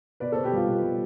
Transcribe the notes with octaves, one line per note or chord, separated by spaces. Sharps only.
B2 B4 D5
B2 A4 C5
G4 B4
G3 F4
B2
G3